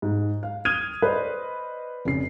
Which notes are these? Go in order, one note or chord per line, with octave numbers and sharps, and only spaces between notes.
G#2
F5
D#6 F6 G#6 D#7 F7 G7
B4 C5 D5 D#5
F1 C#3 C7